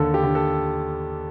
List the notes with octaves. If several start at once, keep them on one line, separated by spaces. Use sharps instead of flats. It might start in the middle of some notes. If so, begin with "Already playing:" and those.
Already playing: D#2 D3 A4
G4
D3
A4